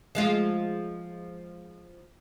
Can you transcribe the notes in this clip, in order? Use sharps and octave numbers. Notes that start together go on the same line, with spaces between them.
F3 G#3 F4